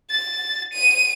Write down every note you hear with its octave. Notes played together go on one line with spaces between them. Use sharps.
A6
D#7